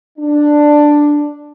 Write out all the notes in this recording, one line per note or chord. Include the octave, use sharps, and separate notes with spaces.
D4